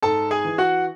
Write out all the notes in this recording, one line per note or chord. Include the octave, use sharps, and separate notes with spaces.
G#2 A4 A5
G#4 G#5
E3
F#4 F#5